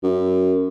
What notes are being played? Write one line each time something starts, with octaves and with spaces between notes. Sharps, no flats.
F#2